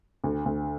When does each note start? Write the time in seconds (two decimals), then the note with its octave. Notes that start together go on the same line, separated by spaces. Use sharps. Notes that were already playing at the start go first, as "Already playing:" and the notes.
0.24 D2
0.46 D2